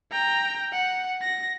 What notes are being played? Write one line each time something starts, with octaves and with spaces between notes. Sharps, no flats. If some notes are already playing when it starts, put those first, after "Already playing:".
G5 A#5
F#5
A#6